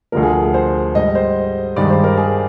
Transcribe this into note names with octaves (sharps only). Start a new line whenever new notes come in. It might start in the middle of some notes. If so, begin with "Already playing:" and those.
D2 D3 F3 A#4
G#4
G#4
C5
G#2 G3 D#5
C5
G2 D#3 G#3 D5
C5
A#4
G#4